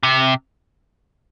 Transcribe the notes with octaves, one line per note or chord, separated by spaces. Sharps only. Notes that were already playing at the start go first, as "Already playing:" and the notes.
C3